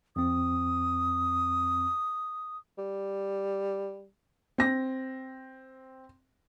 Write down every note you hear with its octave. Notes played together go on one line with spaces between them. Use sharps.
F2 C4 D#6
G3
C4 A#6